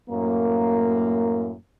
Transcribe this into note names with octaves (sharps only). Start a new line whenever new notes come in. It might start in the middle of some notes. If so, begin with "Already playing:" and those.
F#2 A2 A#3